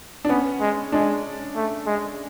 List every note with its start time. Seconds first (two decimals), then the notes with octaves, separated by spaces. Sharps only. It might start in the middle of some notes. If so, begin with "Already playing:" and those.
0.25 D4
0.29 B3 C#4
0.61 G#3
0.92 G#3 D4
1.56 A3
1.87 G#3